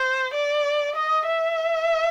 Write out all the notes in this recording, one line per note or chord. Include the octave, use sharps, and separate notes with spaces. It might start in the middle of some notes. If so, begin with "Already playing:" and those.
Already playing: C5
D5
D#5
E5